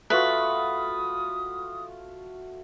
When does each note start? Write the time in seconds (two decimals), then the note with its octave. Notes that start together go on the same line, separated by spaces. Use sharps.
0.10 A3 F4 F#4 B4 D#6